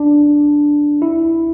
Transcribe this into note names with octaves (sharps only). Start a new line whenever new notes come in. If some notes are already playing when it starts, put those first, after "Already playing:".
Already playing: D4
E4